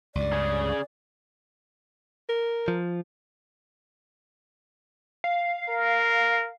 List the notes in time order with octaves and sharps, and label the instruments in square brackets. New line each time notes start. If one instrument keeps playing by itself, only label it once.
[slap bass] C#2 G2 [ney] D5
[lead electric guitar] C#3 G#4
[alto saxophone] A#4
[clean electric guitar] F3
[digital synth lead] F5
[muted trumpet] A#4